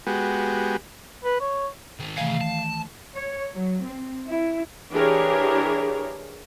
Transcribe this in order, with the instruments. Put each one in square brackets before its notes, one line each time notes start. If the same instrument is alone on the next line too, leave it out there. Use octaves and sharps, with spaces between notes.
[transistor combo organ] G#3 B3 F#4 G4
[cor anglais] B4
C#5
[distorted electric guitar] D#3 G#3
[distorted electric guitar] C3 G#4 [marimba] D#3 E3 A3 [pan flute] F5
[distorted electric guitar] A5
[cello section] C#5
F#3
C4
E4
[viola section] E3 D4 G4 G#4 A#4 C#5